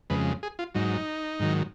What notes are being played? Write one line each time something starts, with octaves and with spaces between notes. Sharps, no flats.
F2 C#3 G#3 B4
G#4
F4
G#2 F#3 D#4
G#2 D#3 F#3